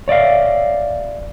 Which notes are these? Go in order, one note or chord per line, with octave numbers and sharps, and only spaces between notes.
C#5 D5 E5 F5